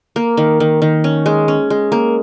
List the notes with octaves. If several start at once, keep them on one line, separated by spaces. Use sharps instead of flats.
A#3
D#3
D#3
D#3
C#4
G#3
C#4
G#3
A#3